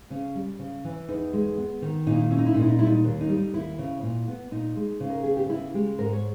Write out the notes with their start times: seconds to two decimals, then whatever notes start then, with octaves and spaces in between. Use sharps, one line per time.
0.10 C#3 C#4
0.35 G3
0.59 C#3
0.85 E3
1.09 E2 D#4
1.33 G#3
1.58 B3
1.82 D#3
2.07 A#2 D#4
2.15 E4
2.22 D#4
2.31 C#4 E4
2.39 D#4
2.46 E4
2.54 A#2 D#4
2.62 E4
2.70 D#4
2.79 G3 E4
2.87 D#4
3.04 D#2
3.21 D#4
3.29 G3
3.37 D#4
3.54 D#2 E4
3.79 C#3
4.03 A#2
4.28 B3
4.51 A#2 D#4
4.76 G#3
5.00 C#3
5.10 A#4
5.23 B3 G#4
5.37 G4
5.49 C#3 E4
5.74 G#3 G4
5.99 G#2 A#4
6.13 C#5